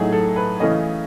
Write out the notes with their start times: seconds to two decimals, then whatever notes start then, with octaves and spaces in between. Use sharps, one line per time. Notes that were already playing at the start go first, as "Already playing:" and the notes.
Already playing: A2 F#3 A3 D#4 G#4
0.12 A4
0.36 B4
0.60 C#3 E3 A3 C#4 D#5